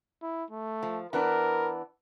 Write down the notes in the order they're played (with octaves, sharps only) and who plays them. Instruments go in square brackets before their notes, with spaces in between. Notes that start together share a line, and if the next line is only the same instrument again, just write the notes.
[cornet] E4
A3
[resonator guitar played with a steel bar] F3
[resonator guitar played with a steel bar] E3 B3 D4 [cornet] A#4